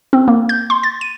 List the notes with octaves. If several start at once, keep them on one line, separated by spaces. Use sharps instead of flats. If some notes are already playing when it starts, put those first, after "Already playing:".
C4
A#3
G6
C6
A6
D#7